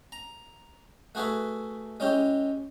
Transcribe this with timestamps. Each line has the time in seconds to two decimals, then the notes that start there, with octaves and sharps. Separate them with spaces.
0.12 A#5
1.15 A3 F#4 G#4 B4 E5
2.00 G#3 C#4 E4 G4